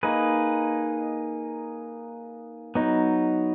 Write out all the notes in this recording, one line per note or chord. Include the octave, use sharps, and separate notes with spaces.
A#3 D#4 G#4 B4
F#3 B3 D#4